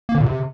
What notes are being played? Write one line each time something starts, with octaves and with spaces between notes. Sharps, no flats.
A#3
D3
A#2
C3